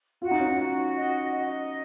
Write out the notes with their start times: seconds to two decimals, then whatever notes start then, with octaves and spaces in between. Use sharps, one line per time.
0.22 F4 F#4
0.31 D#4
0.40 C#4
0.48 D#4
0.59 F#4
0.97 D#5
1.34 D#5